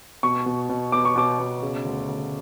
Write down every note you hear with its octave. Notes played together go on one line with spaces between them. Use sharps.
B2 C#6
B2
B2
B3 D6
C#6
B2 D6
B2
C#3
D2
D2